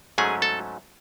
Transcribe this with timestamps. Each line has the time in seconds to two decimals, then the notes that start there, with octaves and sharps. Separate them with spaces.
0.18 G#2 F#3 A3 C#4 G#4 G#5
0.42 A4 A5